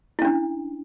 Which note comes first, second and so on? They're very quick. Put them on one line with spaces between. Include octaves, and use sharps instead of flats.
E4 C#4 D4